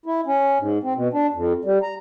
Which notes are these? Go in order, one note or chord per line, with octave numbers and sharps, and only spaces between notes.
E4
C#4
G#2
C4
B2
D4
F2
G3
A#5